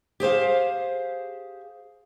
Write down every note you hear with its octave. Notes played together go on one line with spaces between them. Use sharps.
G4 G#4 C5 F5